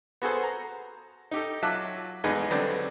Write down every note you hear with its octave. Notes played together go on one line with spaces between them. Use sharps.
B3 F#4 G#4 A4 C5
A#5
D#4 G4 A4
F#3 F4 E5 A5 D6 F#6
A1 E2 G#3 D#4 G#4 B4
D3 F#3 G3 B3 C4 D4